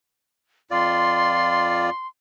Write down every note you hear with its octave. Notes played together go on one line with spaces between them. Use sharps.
F2 F4 D5 C6